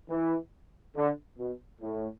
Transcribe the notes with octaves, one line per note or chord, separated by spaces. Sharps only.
E3
D3
B2
A2